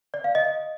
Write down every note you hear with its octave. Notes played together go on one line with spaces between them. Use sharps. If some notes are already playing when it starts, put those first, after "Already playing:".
D5
F5
D#5